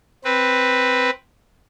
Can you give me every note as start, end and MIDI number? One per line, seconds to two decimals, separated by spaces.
0.24 1.10 60
0.24 1.10 71